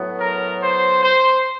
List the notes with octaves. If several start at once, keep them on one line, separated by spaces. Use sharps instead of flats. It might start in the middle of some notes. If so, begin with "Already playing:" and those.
Already playing: A2 F#3 B3
A#4
C5
C5